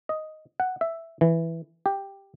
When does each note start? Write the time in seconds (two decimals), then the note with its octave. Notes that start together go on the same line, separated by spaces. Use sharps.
0.09 D#5
0.60 F#5
0.81 E5
1.21 E3
1.86 G4